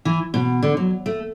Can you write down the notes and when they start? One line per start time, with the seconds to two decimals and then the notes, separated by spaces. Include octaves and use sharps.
0.05 E3
0.34 B2
0.63 D3
0.77 F#3
1.06 A3